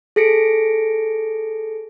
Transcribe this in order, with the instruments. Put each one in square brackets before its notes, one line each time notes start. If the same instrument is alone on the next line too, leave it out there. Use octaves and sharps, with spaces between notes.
[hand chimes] G#4 A4 A#6 C#7 D7